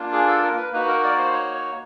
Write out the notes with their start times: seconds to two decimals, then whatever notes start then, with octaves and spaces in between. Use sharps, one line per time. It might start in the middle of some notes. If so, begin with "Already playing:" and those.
Already playing: A#3 D4 F4
0.13 G#4
0.27 A4
0.43 A#4
0.57 B4
0.72 A#3 D#4 F#4 B4
0.88 A#4
1.04 D5
1.18 C5
1.33 C#5
1.55 C#5